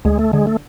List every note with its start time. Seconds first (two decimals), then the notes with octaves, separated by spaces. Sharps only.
0.05 D2 G#3
0.19 A3
0.33 D3 G#3
0.47 A3